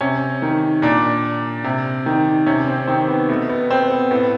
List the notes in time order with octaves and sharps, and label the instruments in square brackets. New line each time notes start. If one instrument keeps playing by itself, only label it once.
[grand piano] C3 C#4
D#3
A#2 D4
C3
D#3
C3 C#4
C4
D#3 C4
B3
B2 A3
B3
C4
B3
A2 B3